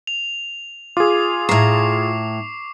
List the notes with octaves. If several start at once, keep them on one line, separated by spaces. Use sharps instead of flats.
F7
F4 G#4 D6
A2 A#5 C#6 C7